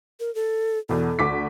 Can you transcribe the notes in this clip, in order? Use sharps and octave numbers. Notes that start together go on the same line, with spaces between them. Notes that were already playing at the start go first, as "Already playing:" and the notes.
A#4
A4
E2 B2 A4
D2 D6 B6